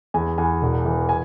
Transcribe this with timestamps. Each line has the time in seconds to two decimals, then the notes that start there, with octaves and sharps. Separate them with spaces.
0.14 E2 G#5
0.38 E2 G#5
0.62 E1
0.85 E3
1.09 G#5